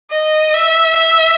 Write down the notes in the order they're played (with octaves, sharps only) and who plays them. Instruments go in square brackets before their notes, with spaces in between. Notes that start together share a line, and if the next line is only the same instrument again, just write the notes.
[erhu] D#5
E5
E5